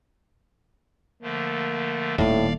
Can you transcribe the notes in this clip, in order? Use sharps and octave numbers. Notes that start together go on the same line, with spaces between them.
D3 F3 A3 A#3
D#1 D#2 A2 A3 D5 F5